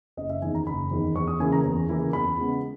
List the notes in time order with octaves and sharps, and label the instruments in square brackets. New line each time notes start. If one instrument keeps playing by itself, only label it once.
[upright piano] F#1 D#5
E5
E2 D#3 G#5
A#5
F#1 B5
E2 D#3
E2 C#6
D#6
C#3 E3 A#3 E4 G#5
A#5
E2
C#3 E3 A#3 E4
E2 B5
C#3 G#3 B3